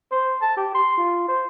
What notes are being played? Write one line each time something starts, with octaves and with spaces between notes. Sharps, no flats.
C5
A5
G4
C6
F4
C5